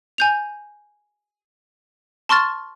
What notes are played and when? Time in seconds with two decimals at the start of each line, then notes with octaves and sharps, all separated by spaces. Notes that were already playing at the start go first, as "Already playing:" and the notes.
0.18 G#5 G6 F7
2.29 A5 C6 C#6 F6 A6